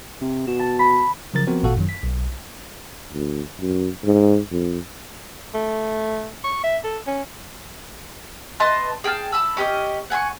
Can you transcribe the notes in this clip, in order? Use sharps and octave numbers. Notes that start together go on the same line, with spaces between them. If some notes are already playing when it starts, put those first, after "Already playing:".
C3
B2 E7
A5
B5
C#3 F3 F#3 A#4 A6
F3 B3 C4 F#4 A#4 C5
G#1 A#2 F#4 A4 F5 F#5
F#2 D#3 F#3
B6
B1
D2
F#2
G#2
F2
A3
C#6
E5
A4
C#4
B4 D#5 A5 C6
G#4 G5 A5 F6
A5 B5 E6
C#4 G4 B4 D#5
F#5 G#5 B5 C#6